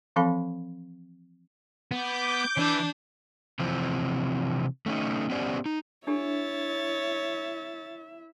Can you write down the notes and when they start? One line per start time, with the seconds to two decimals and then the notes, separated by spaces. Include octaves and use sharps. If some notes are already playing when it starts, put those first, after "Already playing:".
0.16 E3 F3 C4 A4 F5 B5
1.91 B3 D6 G6
2.57 E3 D4
3.59 C3 E3 F3 C4
4.86 A3 C#4 D#4
5.30 B3 C#4 G4 C5 D5
5.66 D#4
6.07 D4 E4 G4 A4 C#5 E5 A6